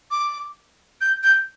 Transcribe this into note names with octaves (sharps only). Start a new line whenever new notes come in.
D6
G6
G6